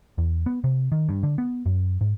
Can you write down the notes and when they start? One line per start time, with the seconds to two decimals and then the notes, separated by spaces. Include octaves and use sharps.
0.18 E2
0.46 B3
0.64 C3
0.92 D#3
1.09 G2
1.23 D3
1.38 B3
1.66 F#2
2.01 G#2